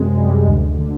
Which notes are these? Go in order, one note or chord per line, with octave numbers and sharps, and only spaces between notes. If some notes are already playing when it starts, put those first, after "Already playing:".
Already playing: F#2 C3 G#3
G3
D2
D3